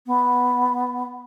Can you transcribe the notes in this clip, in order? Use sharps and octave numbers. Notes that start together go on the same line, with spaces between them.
B3